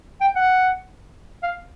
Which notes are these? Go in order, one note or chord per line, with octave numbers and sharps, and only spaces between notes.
G5
F#5
F5